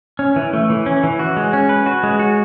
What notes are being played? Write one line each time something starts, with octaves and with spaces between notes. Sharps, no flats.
C#4
E3
A3
E3
C#4
E3
F#4
G#3
C#4
B4
F#4
G#3
F#4